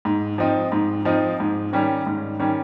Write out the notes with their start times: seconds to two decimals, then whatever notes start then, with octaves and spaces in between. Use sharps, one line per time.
0.05 G#2
0.38 F3 C4 D#4
0.72 G#2
1.05 F3 C4 D#4
1.40 G#2
1.73 D#3 G3 C#4
2.07 G#2
2.40 D#3 G3 C#4